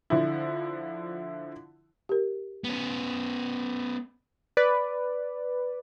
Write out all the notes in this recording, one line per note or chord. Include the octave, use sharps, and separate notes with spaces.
D3 F3 E4
G4 A#4
B3 C#4
B4 D5